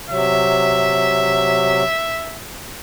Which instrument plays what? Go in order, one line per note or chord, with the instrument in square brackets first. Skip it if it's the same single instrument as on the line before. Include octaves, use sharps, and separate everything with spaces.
[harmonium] C3 F#3 [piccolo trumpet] E5